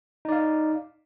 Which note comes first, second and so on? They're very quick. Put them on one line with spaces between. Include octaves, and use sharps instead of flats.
D#4 D5 F5